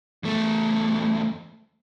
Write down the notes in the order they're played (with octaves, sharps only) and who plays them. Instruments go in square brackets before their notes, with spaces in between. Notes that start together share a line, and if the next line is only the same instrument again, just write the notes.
[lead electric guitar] E2 A3